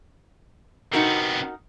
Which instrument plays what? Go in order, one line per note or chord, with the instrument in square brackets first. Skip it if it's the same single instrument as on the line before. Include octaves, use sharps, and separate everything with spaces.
[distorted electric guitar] C3 B3 [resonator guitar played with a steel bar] D#4 F#4 A#4